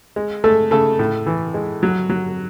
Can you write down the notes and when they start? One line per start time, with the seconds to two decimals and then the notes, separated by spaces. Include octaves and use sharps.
0.16 G#3
0.44 G#3 A3 A4
0.71 C#3 A3 A4
0.99 A2
1.26 E3
1.54 G#3
1.83 F#3
2.09 F#3